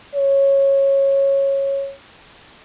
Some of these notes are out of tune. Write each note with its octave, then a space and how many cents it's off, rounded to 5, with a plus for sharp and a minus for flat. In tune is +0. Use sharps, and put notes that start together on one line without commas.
C#5 -15